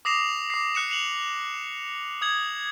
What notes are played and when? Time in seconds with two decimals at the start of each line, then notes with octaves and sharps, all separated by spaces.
0.05 D6 D#6 A#6 C7 E7 F7
0.50 D6 C7
0.75 D#6 F#6 C#7 E7
0.89 C7 F7 F#7
2.21 D#6 G#6 F#7